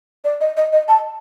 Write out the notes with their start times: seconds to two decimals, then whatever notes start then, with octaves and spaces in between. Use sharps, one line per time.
0.24 D5
0.41 D#5
0.57 D#5
0.72 D#5
0.88 A5